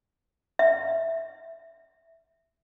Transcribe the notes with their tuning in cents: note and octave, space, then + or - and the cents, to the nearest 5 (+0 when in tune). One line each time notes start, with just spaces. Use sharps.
E5 +0